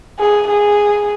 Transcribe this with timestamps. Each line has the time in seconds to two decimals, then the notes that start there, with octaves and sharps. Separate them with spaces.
0.19 G#4
0.48 G#4